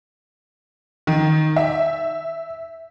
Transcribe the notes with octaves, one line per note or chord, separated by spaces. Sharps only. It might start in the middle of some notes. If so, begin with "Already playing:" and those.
D#3
E5